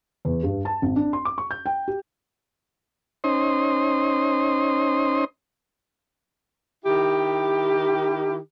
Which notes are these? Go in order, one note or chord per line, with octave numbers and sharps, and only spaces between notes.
E2
G2
A5
G#1
D4
C6
D6
C#6
G6
G5
G4
C#4 D#4 C5 C6 D#6
D#3 E4 G4